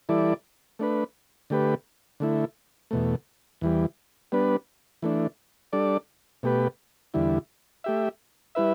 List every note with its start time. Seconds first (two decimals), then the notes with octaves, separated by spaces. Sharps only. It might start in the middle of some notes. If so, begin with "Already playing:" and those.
0.09 E3 G3 E4 A4 D5
0.79 A3 D4 B4
1.50 D3 A3 G4 B4
2.20 D3 A3 E4
2.91 E2 B2 A3
3.61 E2 E3 G3
4.32 G3 B3 D4 B4
5.02 E3 A3 D4
5.73 G3 D4 A4 D5
6.43 B2 A3 G4 B4
7.14 E2 D3 G3 E4
7.84 A3 G4 E5
8.55 G3 E4 B4 E5